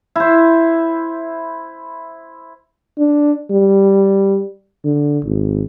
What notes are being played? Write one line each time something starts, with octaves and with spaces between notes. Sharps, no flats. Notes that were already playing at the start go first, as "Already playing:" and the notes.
E4 C5
D4
G3
D3
G#1